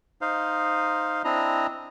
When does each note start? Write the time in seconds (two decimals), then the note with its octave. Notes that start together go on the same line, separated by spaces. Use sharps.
0.21 D#4 C5 F5
1.24 C4 D4 E4 D#5 A#5